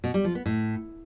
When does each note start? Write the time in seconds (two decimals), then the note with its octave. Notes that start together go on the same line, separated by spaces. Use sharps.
0.04 B2
0.14 G3
0.25 F3
0.35 B3
0.46 A2